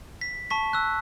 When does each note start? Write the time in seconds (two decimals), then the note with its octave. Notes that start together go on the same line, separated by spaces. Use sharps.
0.21 B6
0.50 A5 C#6 B6
0.73 E6 F#6